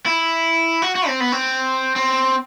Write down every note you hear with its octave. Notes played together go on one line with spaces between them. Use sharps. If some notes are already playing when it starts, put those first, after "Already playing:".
E4
F#4
F#4
C4
B3
C4
C4